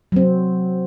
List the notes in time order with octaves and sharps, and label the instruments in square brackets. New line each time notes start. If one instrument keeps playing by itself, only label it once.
[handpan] F#3 C4